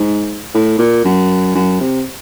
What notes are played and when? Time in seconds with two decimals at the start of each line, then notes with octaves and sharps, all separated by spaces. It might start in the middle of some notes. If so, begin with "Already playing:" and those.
Already playing: G#2
0.54 A2
0.79 A#2
1.05 F#2
1.55 F#2
1.81 C3